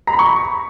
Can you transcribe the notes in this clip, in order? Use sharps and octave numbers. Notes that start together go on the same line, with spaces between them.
A#5
B5
C#6